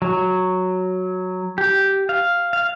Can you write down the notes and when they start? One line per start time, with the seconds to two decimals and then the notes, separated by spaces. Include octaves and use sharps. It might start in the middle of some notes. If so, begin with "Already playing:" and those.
0.02 F#3
1.58 G4
2.09 F5
2.53 F5